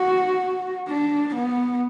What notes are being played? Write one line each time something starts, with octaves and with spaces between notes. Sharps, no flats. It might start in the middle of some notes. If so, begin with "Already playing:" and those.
Already playing: F#4
D4
B3